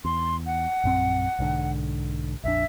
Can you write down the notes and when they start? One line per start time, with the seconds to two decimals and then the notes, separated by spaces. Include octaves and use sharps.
0.05 E2 C6
0.46 F#5
0.84 A#1 F#2 C4
1.39 B1 G#2 D3
2.44 A#1 F2 D4 E5